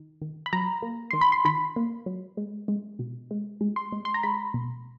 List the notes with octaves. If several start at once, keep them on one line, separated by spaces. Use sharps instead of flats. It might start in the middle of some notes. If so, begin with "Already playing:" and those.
Already playing: D#3
D#3
B5
F#3 A#5
A#3
D#3 C6
B5
C6
D#3 B5
A#3
F#3
G#3
G#3
B2
G#3
G#3
C6
G#3
C6
A#5
G#3 B5
B2